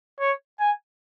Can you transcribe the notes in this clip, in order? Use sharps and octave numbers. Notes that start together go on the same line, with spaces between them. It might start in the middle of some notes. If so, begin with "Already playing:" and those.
C#5
G#5